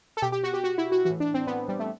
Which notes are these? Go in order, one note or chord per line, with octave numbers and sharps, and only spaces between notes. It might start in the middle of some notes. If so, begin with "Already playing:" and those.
A4
B2 G4
G4
F#4
G4
F#4
E4
F#4
E3 F#4
A2
D4
C4
B3
G3
A3